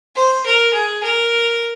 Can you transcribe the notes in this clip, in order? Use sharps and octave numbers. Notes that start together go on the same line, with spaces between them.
C5
A#4
G#4
A#4